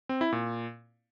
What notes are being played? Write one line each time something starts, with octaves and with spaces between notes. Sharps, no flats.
C4
E4
A#2